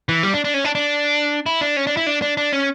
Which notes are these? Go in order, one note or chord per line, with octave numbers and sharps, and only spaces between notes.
E3
G3
D4
D4
C#4
D4
D4
E4
D4
C#4
D4
E4
D4
D4
D4
C#4